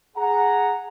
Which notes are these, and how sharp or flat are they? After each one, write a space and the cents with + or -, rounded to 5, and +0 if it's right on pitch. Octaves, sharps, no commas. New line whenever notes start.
G#4 +0 F#5 -5 A#5 +0